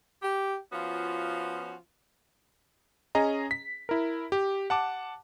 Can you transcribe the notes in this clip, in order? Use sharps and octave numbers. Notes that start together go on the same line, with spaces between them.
G4
F3 B3 C#4 F4 F#4
C#4 G#4 D#5 A#5
B6
E4 A#4
G4
F#5 A5 D6